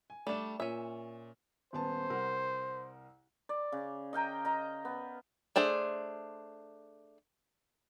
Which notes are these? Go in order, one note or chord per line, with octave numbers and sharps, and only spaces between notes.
G#5
G3 A3 D4 E7
A#2 C#4 E5
D#1 B3 C5 A5
C2 A#4 F#5
D5
C#3
D#5 F5 G5 A#5
D#5 A#5
B3
A3 D4 G#4 C5